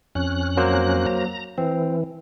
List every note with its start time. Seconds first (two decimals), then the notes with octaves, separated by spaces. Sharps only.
0.15 F2 C#4 F#6
0.57 F#3 A#3 C5
1.07 A#5
1.58 E3 C4